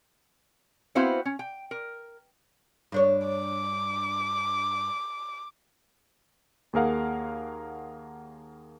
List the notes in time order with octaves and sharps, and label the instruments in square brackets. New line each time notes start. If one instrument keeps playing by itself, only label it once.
[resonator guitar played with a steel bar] B3 C4 E4 F#4 C5 F5
C#4
G5
A#4
[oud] G2 D4 C#5
[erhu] D6
[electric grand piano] D#2 A#3 G#4 A#4 F5 F#5